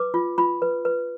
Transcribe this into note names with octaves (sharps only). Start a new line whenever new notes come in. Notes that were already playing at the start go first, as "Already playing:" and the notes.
Already playing: B4 D6
F4
F4 B5
B4
B4